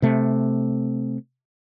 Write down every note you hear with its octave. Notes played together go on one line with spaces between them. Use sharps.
C3 A3